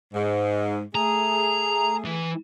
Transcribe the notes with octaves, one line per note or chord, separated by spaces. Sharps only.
G#2
A3 G#4 A#5
E3